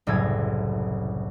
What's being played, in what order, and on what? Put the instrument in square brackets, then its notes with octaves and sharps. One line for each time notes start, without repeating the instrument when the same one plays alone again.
[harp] F#1 C2 A2 A4 G#6 A#6